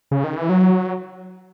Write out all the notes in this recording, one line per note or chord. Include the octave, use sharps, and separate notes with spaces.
C#3
D#3
E3
F#3